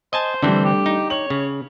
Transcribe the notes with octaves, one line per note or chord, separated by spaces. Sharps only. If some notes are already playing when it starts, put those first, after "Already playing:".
C5 D#5 G#5 A5
D3 E3 G3 A3 C4 D4
G4
D#4
C#5 F#7
C#3